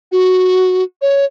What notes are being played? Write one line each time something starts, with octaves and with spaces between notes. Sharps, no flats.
F#4
C#5